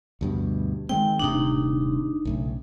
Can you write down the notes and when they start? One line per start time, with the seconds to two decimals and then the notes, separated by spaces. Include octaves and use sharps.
0.21 D2 G2 B2
0.89 D#3 G#3 C4 G5
1.19 D#1 A2 C3 D4 D#4
2.25 B1 A2 C#3